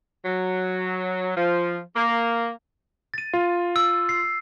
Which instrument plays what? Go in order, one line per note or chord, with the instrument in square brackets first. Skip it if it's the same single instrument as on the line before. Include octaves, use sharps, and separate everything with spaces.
[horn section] F#3
F3
A#3
[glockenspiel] A6 D#7
[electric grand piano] F4
[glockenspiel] E6
C7